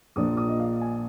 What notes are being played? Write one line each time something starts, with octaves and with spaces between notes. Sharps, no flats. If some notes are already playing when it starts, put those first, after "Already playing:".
A#1 A#2 F3 A#3 D4 D#6
D#6
D#5
F5
G#5